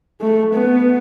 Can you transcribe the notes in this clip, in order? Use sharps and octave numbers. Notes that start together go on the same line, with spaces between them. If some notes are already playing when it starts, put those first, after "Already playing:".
A3
B3